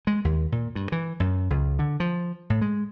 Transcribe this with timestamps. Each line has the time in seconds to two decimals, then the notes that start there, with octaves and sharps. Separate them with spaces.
0.07 G#3
0.25 D#2
0.52 A#2
0.75 G2
0.92 E3
1.20 F#2
1.50 C#2
1.79 D3
2.00 F3
2.50 A2
2.61 G#3